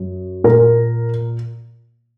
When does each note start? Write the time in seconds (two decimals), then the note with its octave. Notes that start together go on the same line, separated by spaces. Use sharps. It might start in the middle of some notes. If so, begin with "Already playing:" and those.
Already playing: F#2
0.44 A#2 A#4